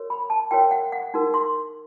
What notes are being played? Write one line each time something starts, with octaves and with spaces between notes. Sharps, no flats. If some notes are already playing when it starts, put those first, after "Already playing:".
Already playing: F#4 A#4 C#5
B5
A5
F#4 A#4 C#5 G5
F#5
F#5
D#4 F#4 A#4
C6